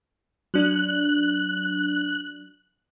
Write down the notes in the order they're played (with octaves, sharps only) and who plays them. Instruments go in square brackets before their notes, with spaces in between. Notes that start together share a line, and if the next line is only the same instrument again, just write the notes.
[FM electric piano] F#3 D4 [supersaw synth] F#6